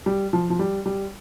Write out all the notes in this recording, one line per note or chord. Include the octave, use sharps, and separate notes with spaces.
G3
F3
F3
G3
G3